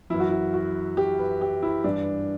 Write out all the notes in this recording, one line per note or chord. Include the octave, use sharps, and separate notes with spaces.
F#2 E3 E4
F#4
E4
F#4
G4
B4
G4
E4
G2 E3 D4